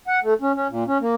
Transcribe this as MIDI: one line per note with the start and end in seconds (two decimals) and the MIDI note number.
0.08 0.20 78
0.22 0.34 57
0.41 0.52 61
0.55 0.67 61
0.69 0.84 46
0.87 0.98 61
1.01 1.15 58